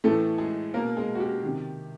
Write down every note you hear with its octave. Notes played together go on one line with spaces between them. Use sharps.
A2 E3 A3 A4
G#3 G#4
B2 A#3 A#4
G#3 G#4
F#4
G4
C3 D#3